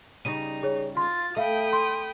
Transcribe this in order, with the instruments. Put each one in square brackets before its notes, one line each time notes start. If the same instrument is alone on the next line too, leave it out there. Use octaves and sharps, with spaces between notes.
[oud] C#3 G3 [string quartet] D#4 [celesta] D#7
[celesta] G#4 C#5
[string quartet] F4 A6 [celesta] C6
[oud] A3 [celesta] E5 F5 [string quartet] G5 B5 D#6
[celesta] C6